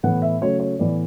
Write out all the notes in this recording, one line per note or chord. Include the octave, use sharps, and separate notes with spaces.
A2 E3 B3 F#5
E5
C#3 F#3 A3 C#5
C#5
A2 E3 B3 D5